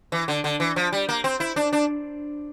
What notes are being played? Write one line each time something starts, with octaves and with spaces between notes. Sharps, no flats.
E3
D3
D3
E3
F3
G3
A#3
C4
E4
D4
D4